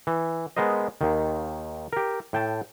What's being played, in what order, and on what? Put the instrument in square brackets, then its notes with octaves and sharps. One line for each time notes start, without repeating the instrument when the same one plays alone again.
[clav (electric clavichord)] E3
G#3 B3 A#4 C5 D#5
D#2 D#3
G4 A#4
A2 G5 A5